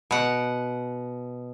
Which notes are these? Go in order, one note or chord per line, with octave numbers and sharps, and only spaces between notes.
B2 F#5